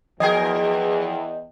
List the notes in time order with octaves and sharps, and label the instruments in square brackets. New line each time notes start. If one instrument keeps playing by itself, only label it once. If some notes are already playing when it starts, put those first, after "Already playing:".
[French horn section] E2 [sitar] F3 G#4 A#4 [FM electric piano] D#5 G5